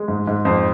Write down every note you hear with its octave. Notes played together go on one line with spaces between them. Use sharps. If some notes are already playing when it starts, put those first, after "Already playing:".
Already playing: G#3
G#2
G#2
F2 C5